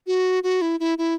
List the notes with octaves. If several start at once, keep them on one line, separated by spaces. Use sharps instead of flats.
F#4
F#4
E4
E4
E4